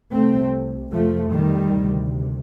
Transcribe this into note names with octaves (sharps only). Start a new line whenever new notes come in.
C2 C3 A3 C4
F2 C3 F3 A3
D#3 G3
D2 C3